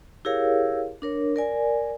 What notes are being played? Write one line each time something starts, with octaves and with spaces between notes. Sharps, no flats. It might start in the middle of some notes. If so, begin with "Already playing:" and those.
E4 G4 G#4 A#4 C#5 F5
D4 A#4 C#5
A#4 D5 G#5